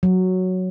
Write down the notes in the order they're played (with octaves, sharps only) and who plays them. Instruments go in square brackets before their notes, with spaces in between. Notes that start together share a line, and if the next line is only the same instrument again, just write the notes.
[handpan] F#3